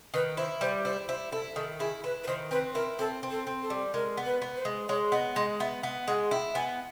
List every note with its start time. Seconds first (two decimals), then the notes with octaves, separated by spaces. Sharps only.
0.14 D#3 B4
0.37 E4 C5
0.61 G3 C5
0.85 E4 C5
1.08 E4 C5
1.32 E4 A4
1.56 D#3 A4
1.80 E4 G#4
2.04 E4 B4
2.24 B4
2.27 D#3 C5
2.51 C4 B4
2.75 E4 A#4
2.99 C4 A4
3.23 C4
3.31 A4
3.47 C4
3.62 A4
3.70 G3
3.94 G#3 A#4
4.17 B3
4.26 B4
4.42 B3
4.56 C5
4.65 G#3
4.89 G#3 C#5
5.12 B3 D#5
5.36 G#3 D#5
5.60 B3 E5
5.83 B3 F#5
6.08 G#3 F#5
6.31 E4 G5
6.55 B3 G#5